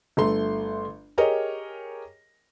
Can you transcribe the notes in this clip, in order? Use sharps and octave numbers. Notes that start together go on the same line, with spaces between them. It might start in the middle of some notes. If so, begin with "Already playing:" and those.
G1 A3 C6
G4 G#4 A#4 C#5 D#5